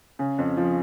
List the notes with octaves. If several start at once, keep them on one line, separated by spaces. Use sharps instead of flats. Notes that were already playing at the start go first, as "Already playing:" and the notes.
C#3
F2
F3